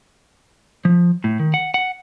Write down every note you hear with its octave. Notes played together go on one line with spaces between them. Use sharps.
F3
A2
D#3
F#5
F#5